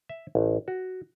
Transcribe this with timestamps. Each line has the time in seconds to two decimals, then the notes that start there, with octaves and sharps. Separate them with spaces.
0.09 E5
0.35 A1
0.68 F#4